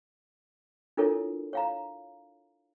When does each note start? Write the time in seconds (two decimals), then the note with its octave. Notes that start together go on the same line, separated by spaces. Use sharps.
0.97 D4 E4 F4 A4 A#4 C#5
1.53 C#5 F5 A#5